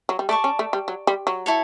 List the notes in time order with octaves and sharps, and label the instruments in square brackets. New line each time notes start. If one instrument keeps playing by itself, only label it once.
[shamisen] F#3
G3
[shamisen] A3 [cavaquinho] D5 A5 C#6
[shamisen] C#4
A3
G3
F#3
G3
F#3
[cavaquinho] E4 A4 C#5